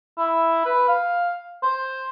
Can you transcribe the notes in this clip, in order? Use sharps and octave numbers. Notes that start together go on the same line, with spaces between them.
E4
B4
F5
C5